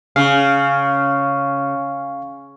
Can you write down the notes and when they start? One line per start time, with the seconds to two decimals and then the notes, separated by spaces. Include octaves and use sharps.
0.16 C#3 F5